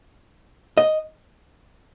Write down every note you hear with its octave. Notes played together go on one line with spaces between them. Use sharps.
D#5